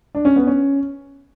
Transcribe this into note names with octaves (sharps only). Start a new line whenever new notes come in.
D4
C#4
B3
C#4